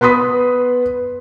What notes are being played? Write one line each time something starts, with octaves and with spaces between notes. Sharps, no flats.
B3 B4 C6 D#6 B6